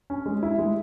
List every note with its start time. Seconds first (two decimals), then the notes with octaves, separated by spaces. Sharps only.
0.10 C#4
0.26 G#3
0.43 E4
0.59 G#3